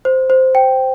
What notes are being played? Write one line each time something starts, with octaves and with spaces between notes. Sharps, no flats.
C5
C5
G5